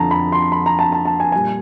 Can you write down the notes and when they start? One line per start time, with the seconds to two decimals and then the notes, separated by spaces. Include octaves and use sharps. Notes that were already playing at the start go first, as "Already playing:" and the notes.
Already playing: F2 D3 F3 A5 A#5
0.11 B5
0.32 C6
0.52 B5
0.66 A#5
0.79 A5
0.92 A5
1.05 A5
1.20 G#5
1.32 A#2 G3 G#5